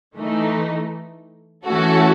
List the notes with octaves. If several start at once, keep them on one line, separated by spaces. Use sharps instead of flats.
E3 A3 D#4
E3 A3 C#4 F#4 A4